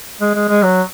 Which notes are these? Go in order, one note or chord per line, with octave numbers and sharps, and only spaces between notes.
G#3
G#3
G#3
F#3